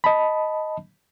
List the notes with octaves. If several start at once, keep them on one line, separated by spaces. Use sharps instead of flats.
D#5 A5 B5